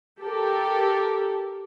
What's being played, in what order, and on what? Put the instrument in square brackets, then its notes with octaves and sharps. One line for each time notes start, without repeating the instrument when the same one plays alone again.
[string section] G4 A4 A#4